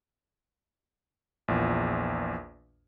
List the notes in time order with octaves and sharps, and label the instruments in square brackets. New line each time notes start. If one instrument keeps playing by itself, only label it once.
[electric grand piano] A#1 E2 A#2